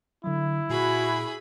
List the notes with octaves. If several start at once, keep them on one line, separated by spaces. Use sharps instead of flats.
D3 F#3 E4
A#2 F#4 G#4 B5